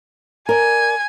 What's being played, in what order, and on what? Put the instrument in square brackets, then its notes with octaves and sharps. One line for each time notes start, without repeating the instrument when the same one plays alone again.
[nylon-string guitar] A#4 D5 [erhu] G#5